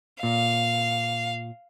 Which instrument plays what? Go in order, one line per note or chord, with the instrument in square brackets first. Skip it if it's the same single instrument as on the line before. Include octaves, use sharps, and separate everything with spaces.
[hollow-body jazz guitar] A#2 [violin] F5